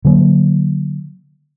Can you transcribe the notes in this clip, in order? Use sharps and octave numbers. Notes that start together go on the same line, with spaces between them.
D3 F#3 A3 A#3